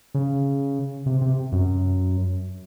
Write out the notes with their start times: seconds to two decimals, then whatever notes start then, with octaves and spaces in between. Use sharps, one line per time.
0.15 C#3
1.06 C3
1.21 C3
1.52 F#2